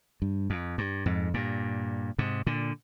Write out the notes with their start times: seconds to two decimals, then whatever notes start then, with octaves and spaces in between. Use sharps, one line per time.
0.22 G2
0.50 F2
0.78 G2
1.06 F2 G#2
1.34 G2 A#2
2.18 G#2 C3
2.47 A#2 D3